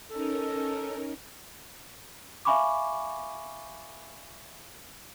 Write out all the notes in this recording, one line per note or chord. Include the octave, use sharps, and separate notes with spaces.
C#4 D#4 A4 A#4
E5 F5 G#5 B5 C#6 D6